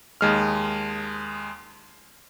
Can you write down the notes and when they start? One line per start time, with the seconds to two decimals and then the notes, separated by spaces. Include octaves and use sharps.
0.21 D#2 G#3 F6